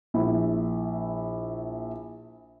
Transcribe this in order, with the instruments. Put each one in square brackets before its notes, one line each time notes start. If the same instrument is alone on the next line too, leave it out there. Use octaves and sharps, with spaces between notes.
[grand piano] A#1 E4